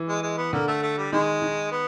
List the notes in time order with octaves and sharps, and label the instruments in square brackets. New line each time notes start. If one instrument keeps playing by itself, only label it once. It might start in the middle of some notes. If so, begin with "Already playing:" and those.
Already playing: [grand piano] E3
[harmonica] G#3
G#3
B3
[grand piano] D3 [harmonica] A#3
[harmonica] A3
A3
G3
[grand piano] D#3 [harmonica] G#3
[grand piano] D#3
[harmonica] B3